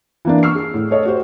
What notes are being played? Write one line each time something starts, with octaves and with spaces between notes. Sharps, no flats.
E3 A#3 D4
C#6 E6 F6 C7
G#4
A2
A4 C#5 D#5
F#4 G4 C5